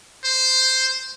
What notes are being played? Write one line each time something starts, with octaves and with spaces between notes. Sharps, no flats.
C5